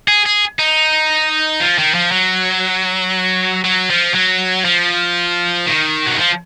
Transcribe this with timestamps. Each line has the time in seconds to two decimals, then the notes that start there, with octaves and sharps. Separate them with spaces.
0.08 G#4
0.26 G#4
0.59 D#4
1.60 F3
1.78 D#3
1.94 F3
2.11 F#3
3.64 F#3
3.90 F3
4.14 F#3
4.65 F3
5.67 D#3
6.07 F#3
6.18 F3